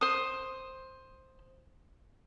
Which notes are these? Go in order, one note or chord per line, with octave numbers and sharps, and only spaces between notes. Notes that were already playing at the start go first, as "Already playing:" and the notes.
C5 D#6